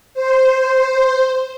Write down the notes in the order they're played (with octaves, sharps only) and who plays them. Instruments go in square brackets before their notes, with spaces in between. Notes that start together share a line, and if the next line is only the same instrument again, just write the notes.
[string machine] C5